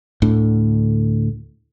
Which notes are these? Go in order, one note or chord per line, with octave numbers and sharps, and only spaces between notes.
D2 A2 D3